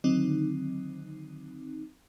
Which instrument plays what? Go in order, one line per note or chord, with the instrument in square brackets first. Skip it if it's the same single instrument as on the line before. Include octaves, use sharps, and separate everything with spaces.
[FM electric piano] D3 D#3 F#3 C4 D#4